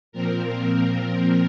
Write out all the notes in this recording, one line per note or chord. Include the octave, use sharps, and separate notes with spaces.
A#2 F3 C4 A#4